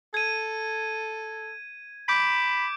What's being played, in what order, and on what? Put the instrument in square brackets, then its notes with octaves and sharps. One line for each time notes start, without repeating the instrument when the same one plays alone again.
[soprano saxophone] A4 [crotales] G#6 D#7
[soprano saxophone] B5 [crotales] D6 G6 D7